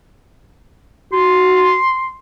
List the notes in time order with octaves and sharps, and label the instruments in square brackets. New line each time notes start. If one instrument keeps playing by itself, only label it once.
[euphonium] F#4 [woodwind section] C6